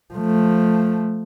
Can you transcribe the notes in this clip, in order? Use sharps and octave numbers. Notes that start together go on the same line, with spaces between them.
F3 A3